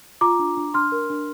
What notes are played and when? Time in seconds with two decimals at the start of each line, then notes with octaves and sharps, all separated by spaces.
0.21 F4 A#5 D6
0.39 D4
0.57 D4
0.74 D4 C6 F6
0.92 A#4
1.10 D4